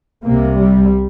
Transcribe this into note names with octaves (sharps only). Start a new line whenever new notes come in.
C2 C3 A#3
G3